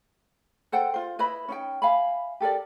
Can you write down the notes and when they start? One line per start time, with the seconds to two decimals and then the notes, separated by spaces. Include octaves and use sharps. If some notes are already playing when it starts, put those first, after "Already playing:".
0.72 A4 C5 F#5 G5
0.94 F4 C5
1.19 E4 B4 D#5 B5
1.48 C#4 D#4 G5
1.82 E5 F5 G#5 B5
2.40 G4 A4 A#4 D5